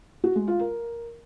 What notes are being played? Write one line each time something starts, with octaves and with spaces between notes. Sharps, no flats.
F#4
G#3
F4
A#4